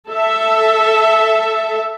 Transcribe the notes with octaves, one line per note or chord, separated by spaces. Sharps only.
A4 E5